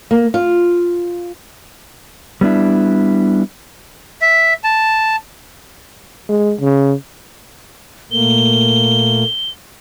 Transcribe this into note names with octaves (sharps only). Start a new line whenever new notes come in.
A#3
F4
G3 B3 D4 E4
E5
A5
G#3
C#3
A#2 A3 A#3 G7